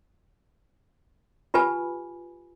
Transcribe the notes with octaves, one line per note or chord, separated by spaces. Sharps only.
F4 G4 B4 G#5 A5 B5